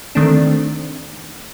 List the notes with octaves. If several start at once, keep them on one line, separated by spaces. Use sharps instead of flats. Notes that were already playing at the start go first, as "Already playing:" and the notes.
D#3 A3 C4 D4